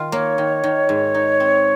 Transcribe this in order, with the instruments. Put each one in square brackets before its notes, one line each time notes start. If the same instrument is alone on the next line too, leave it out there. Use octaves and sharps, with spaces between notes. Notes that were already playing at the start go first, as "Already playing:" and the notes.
Already playing: [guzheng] D#3 F4
[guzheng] A#3 [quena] C#5
[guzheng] D#3
D#3
G#2
D#4
C4